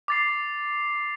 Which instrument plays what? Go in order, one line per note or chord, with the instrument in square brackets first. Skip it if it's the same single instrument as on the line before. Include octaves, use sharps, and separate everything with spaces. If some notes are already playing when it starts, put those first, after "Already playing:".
[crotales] D6 A6 C7